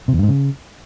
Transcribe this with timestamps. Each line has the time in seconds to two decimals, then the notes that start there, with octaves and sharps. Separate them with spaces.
0.08 C3
0.13 E2
0.18 G2
0.23 G#2
0.28 C#3